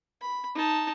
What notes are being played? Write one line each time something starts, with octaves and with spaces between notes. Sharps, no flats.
B5
D#4 A5